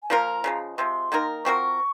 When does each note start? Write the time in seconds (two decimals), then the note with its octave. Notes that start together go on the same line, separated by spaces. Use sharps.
0.03 G#5
0.10 F3 A#3 F4 A#4 A#5
0.44 C#3 F3 G#3
0.78 C3 F3 G#3 C6
1.12 D#3 A#3 D#4 A#4
1.45 F3 C4 F#4 A#4 C#6